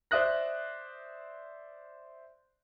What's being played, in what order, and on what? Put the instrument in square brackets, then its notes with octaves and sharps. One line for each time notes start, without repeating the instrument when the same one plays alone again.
[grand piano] C5 D5 E5 D#6 F#6 A#6